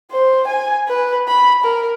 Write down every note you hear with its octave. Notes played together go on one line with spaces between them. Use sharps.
C5
G#5
B4
B5
A#4